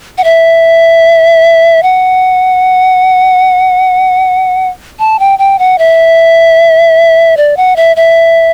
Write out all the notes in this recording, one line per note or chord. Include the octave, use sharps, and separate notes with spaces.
F#5
E5
F#5
A5
G5
G5
F#5
E5
D5
F#5
E5
E5